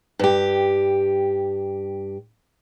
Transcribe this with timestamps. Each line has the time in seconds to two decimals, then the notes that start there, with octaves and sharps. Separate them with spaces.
0.19 G2 G4